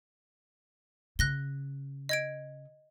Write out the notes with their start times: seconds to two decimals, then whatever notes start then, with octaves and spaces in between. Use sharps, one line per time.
1.19 C#3 F#6 A#6 G7
2.09 D#5 G#6 D7